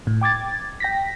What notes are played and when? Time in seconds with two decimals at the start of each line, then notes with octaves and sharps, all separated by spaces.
0.07 A2
0.21 G5 D6 G#6 A6
0.80 G5 A#6 B6